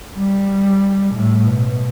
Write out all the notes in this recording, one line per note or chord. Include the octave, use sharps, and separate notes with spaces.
G3
A2
B2